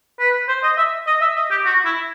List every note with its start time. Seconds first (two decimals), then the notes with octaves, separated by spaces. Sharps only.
0.19 B4
0.48 C5
0.63 D#5
0.77 E5
1.07 D#5
1.21 E5
1.36 D#5
1.50 G4
1.65 F#4
1.85 E4